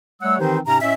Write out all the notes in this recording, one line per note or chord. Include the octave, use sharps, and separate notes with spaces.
G3 A3 C#5 F#5 E6
D#3 E3 C4 D#4 G4 C5
G#2 C3 C#4 A#5
A2 C#4 D#5 E5